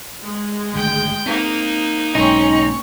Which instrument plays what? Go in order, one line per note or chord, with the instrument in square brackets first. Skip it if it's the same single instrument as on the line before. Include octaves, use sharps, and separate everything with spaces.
[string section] G#3
[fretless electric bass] G#1 D2 [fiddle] G5
[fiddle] A#3 D#4 [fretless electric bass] C4
[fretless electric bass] B1 G#2 [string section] A#3 C4 C#4 [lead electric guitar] D#4 [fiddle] C#6